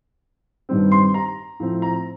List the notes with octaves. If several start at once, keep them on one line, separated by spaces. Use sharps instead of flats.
G2 D#3 G3 C4
C6
A#5
A2 F3 C4
A#5